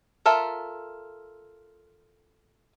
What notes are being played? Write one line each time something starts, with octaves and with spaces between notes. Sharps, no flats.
F4 A4 A#4 E5